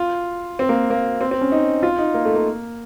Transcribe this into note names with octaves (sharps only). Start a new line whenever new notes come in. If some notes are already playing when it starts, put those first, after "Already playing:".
Already playing: F4
C4
A#3
A#3
C4
C4
C#4
D#4
F4
D#4
A#3
A3
A#3